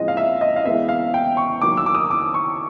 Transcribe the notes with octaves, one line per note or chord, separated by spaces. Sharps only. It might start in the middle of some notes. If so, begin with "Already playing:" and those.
Already playing: A2 F3 G#3 C4 D#5
F5
E5
D#5
F5
E3 G#3 B3 E5
F5
G5
C#6
D#3 F#3 A#3 D6
E6
D6
D#6
D6
C#6